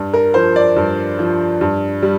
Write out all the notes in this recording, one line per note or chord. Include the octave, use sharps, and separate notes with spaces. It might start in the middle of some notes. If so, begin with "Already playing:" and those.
Already playing: G2
A#4
F3 C5
D5
G2
F3
G2
G3